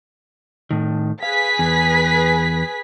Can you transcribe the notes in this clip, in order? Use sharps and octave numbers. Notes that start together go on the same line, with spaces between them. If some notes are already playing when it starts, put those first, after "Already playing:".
A2 D#3
G#4 B4 F5 B6
E2